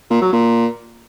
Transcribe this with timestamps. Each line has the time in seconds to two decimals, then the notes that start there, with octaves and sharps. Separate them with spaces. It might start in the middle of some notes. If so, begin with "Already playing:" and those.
0.10 A#2
0.22 F#3
0.33 A#2